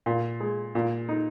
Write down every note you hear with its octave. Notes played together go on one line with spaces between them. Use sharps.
A#2
G#3
A#2
D#4